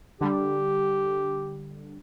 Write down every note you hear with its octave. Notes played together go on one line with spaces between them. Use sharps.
D3 G3 G4